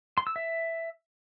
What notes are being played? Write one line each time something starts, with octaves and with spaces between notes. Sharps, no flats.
C6
E6
E5